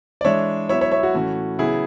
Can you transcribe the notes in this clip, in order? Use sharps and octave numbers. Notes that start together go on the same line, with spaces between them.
D5
E3 G#3 D4 C#5 E5
F#3 B3 E4 C#5 E5
C#5 E5
C#5 E5
F#4
A2 E3 A3 C#4
C#3 F#3 B3 E4 G#4